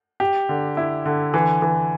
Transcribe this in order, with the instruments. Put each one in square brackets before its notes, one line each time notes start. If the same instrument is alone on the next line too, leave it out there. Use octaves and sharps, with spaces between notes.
[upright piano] G4
D3
E4
D3
E3
E3